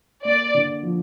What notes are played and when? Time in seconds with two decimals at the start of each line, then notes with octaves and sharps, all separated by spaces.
0.24 A#3 D5
0.54 D3
0.83 F3